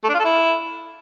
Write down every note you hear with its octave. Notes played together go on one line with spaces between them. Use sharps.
A3
D4
F4
A4
E4